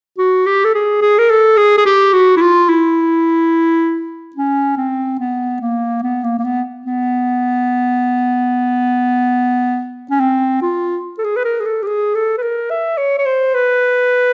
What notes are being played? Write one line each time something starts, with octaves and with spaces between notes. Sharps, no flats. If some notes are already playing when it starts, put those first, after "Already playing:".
F#4
G4
A4
G#4
G#4
A#4
A4
G#4
G#4
G4
F#4
E4
F4
E4
C#4
C4
B3
A#3
B3
A#3
A#3
B3
B3
C#4
C4
F4
A4
G#4
B4
A#4
G#4
A4
G4
G#4
A4
B4
A#4
E5
C#5
C#5
C5
B4